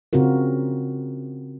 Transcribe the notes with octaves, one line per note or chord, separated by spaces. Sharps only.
C#3 C4 F4 F#4 A#4